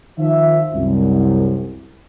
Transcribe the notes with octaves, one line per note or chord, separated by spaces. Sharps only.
D#3 F3 E5
C2 F#2